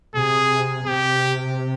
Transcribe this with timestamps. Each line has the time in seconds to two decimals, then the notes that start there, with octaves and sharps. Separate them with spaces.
0.15 C3 G#4
0.86 C3 G4